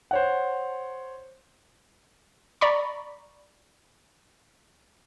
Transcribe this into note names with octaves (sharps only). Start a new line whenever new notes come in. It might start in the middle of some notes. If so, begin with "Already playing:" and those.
C5 C#5 F#5
D5 A#5 B5 C#6